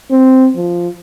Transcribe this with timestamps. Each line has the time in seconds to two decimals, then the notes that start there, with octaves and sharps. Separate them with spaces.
0.11 C4
0.56 F3